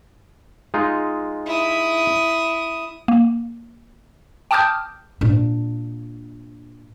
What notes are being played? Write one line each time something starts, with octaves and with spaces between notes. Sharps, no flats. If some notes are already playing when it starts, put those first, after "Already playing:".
G#3 D#4 F4
E4 D#6
A#3
G5 A5 D6 D#6 F6 G6
A#2 D4